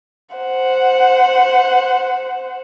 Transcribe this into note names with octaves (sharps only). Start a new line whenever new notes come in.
C5 F#5